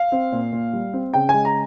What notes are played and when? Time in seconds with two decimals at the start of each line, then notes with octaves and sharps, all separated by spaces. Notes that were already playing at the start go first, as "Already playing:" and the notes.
Already playing: F5
0.12 C4
0.32 A#2
0.53 A#2
0.73 G3
0.93 C4
1.13 C#3 G5
1.29 G#3 G#5
1.45 A#5